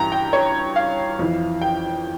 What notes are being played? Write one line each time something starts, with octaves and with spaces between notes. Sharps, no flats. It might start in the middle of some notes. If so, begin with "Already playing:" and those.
Already playing: G2 E3 G5 A#5
G5
C#5
F5
F2 E3
G5